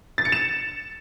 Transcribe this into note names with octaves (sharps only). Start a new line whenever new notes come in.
A6
C#7
E7